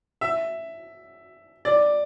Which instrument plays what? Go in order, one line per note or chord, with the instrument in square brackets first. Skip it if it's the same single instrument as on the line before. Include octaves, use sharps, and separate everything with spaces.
[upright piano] E5
D5